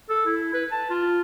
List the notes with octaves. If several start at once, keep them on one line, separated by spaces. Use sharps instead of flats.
A4
E4
B4
A5
F4